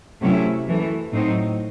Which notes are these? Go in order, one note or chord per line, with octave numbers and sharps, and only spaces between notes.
C3 F#3 A3 C#4 E4
F#2 E3 A3
A2 F#3 C4 D#4